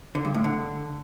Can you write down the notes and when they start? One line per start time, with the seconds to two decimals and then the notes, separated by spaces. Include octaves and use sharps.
0.15 D3
0.25 G2
0.34 A2
0.44 D3